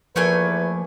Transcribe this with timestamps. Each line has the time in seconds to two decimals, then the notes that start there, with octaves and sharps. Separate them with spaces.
0.16 E2 F3 A3 A#3 B4 G#5